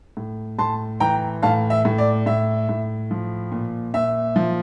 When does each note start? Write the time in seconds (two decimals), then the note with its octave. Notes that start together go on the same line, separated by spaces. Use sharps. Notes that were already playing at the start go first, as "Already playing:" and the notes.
0.17 A2
0.59 A2 A5 C6
1.00 E3 G5 A#5
1.42 A2 F5 A5
1.70 E5
1.85 A2
1.98 D5
2.26 A2 E5
2.69 A2
3.11 F3
3.52 A#2
3.94 A#2 E5
4.36 F3